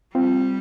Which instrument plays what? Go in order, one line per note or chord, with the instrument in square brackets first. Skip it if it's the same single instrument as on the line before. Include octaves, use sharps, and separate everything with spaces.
[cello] G3 [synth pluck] C4 F4